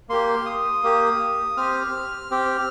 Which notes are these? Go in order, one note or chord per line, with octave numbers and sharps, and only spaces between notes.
A#3 G4 C6
D#6
A#3 G4
C4 G4 F6
C4 G4